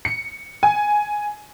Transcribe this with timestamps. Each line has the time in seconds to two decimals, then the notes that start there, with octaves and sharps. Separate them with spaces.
0.05 C#7
0.63 G#5